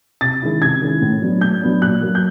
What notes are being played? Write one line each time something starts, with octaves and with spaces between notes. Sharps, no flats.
C3 A6
D#3 G#3 C#4 E4
C3 G#6
D#3 G#3 C#4 E4
A2
F#3 B3 D4
A2 G6
F#3 B3 D4
A#2 F#6
F#3 A#3
G6